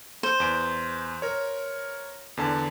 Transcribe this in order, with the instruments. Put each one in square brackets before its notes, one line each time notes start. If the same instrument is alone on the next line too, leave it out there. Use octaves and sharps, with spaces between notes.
[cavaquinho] C5
[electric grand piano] E2 D7
A#4 C#5
E2 D3 A5